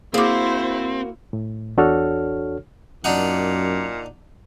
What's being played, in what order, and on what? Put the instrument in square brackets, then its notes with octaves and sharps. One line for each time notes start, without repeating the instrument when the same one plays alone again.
[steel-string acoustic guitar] A#3 F#4 [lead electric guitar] C4 [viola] E4 C5 [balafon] G#4 D6
[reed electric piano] A2
E2 D4 F#4 A4 C#5 F6
[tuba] F#2 [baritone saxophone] A#2 [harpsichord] D4 D#4 F#5